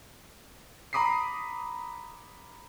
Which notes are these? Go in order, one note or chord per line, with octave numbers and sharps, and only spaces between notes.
A#5 B5 D6 D#6 B6 C7